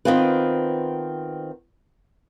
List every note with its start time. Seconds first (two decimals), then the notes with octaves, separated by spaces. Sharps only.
0.05 D#3 B3 C4 F4 B4